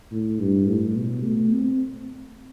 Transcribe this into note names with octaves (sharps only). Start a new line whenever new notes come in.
A2
G2
A2
B2
A3
C4